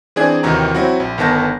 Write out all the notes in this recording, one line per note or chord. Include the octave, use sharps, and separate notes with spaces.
E3 C4 D4 G#4 D5 G#6
D#2 C3 D#3 E3 F#4 A#5
F#3 C4 E4 F#4
A#1
G1 D#3 B3 A5 A#6